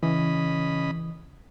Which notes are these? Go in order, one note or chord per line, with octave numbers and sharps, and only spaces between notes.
C#3 E3 D#5 B5